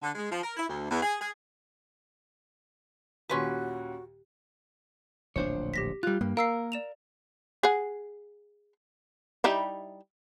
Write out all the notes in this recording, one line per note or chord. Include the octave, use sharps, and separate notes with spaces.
D3
G#3
F3
A#4
E4
D2
E2
G#4
G#4
D#2 A#2 C#4 F#4 G4 B4 C6 C#6
D1 A#1 D4 C5 C#5
G4 A#6 B6
G3 F4 F#6
G2 A#3
A#4 F5 E6 C7
D5 E7 F7
G#4 F#5
G3 D#4 E4